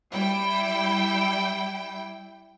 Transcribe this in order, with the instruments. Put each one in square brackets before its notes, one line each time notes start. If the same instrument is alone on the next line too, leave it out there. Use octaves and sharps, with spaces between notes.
[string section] G3 E4 G5